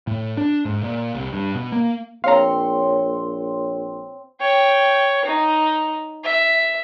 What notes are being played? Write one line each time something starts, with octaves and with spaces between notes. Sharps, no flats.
A2
D4
G#2
A#2
C2
G2
B2
A#3
A#1 C4 C#5 F5 A#5 C6
C#5 G5
D#4
E5